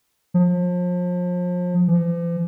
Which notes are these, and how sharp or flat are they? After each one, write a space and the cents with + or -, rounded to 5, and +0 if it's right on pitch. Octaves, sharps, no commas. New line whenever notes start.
F3 +35
F3 -45